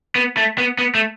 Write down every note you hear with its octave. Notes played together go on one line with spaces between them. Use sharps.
B3
A3
B3
B3
A3